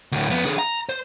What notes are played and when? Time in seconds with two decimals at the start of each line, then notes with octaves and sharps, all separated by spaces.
0.12 D2 A2
0.30 F2 B3
0.45 D3 G#4
0.59 A#5
0.89 C5